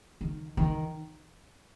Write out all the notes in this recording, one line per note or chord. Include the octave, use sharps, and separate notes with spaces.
D#3
D#3